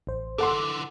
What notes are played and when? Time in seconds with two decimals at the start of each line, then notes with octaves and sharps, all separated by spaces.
0.07 A1 C5
0.38 D3 E3 A4 F#5 C6 D6